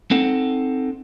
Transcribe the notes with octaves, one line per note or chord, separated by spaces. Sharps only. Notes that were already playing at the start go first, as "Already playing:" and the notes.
C4 D#4 A4 F#5